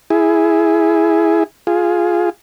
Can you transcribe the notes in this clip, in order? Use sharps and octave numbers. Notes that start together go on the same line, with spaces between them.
E4 G#4
F4 G#4